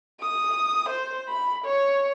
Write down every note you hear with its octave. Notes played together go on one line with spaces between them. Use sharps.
D#6
C5
B5
C#5